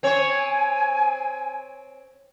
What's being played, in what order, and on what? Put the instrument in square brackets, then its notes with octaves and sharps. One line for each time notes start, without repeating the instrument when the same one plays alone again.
[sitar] C4 C#5 [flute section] G#5